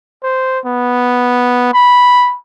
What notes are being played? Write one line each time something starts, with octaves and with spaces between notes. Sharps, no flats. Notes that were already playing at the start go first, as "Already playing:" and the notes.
C5
B3
B5